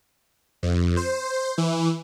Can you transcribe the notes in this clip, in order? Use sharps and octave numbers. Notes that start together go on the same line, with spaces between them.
F2
C5
E3